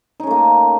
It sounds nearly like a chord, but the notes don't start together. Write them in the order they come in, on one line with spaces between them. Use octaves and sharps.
D#4 C#4 A3 A#3